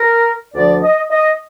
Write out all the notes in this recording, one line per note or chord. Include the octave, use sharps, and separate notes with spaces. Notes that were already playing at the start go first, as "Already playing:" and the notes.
Already playing: A#4
D2 D3 F3 D5
D#5
D#5